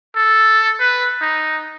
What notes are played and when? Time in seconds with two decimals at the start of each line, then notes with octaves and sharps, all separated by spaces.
0.16 A4
0.80 B4
1.21 D#4